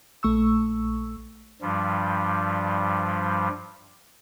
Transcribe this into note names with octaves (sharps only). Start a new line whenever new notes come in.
A#1 A3 C#6 E6
G2 F3 G3